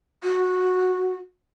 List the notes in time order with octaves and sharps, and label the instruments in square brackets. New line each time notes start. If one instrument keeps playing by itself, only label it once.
[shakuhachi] F#4